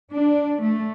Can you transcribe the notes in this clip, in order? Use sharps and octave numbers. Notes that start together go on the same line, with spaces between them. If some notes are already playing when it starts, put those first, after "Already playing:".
D4
A3